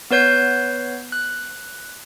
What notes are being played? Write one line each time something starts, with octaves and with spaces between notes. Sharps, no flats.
B3 B4 C#5 G6 C7
F#6